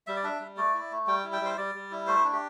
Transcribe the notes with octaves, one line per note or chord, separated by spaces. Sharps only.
G3 E5
D5
D4 E5
G3
A3 D5
E4
A3
G3 G5
E4
G5
G3 C5
G3 D5
G3
E4
A3 C5
D4
G4